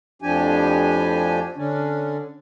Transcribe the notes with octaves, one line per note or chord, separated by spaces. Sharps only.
F2 A2 F3 D4 G4 G#5
D3 C#4 D4